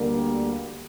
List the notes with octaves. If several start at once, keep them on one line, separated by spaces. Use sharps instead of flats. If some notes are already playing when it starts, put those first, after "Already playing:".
Already playing: D2 D3 G3 A#3